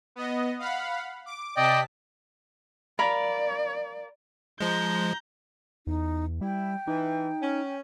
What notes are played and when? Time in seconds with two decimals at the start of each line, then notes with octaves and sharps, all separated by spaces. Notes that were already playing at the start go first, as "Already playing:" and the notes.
0.16 B3 D#5
0.59 F5 F#5 B5
1.26 D6
1.57 C3 D5 D#5 G5 A5 B6
2.99 A#4 D5 F5 B5
4.61 F3 G#3 A#5 G6
5.87 E2 D#4
6.41 G3 E4 G5
6.88 E3 D#4
7.42 C#4